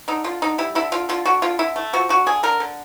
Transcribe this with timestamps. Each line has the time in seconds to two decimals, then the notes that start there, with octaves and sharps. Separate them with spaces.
0.08 D3 D#4
0.24 D3 F4
0.42 D3 D#4
0.58 G3 E4
0.75 D3 E4
0.92 D3 F4
1.09 D3 F4
1.25 D3 F#4
1.42 D3 F4
1.59 D3 E4
1.76 A3
1.93 F3 F#4
2.09 D3 F#4
2.26 D3 G#4
2.43 D3 A#4
2.60 D3